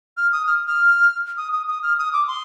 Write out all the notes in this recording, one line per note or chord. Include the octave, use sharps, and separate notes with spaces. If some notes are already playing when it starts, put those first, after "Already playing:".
F6
D#6
F6
F6
D#6
D#6
D#6
F6
D#6
D6
C6